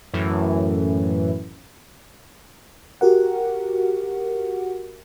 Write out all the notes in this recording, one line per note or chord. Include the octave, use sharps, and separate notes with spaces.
F#2 A2 E3
F#4 G4 A#4 F#5